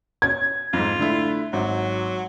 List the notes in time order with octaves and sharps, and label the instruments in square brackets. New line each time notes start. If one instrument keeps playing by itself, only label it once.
[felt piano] C#4 [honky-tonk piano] G#6
[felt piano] F2 G#2 [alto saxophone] F4
[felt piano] D3 A3 E4
[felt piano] G#1 [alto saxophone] F#3